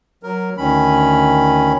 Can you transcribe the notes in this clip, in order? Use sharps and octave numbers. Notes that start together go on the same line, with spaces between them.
F#3 A#4
D2 D#3 C#4 B5